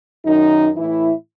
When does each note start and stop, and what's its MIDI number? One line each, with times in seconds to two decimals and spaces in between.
0.24 0.70 42
0.24 0.70 51
0.24 0.70 63
0.76 1.13 45
0.76 1.13 52
0.76 1.13 64